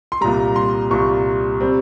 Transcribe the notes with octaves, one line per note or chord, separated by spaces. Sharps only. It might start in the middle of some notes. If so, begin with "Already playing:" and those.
C6
C2 A#2 G3 A#5
C6
C2 A#2 G3 C#6
G3 C4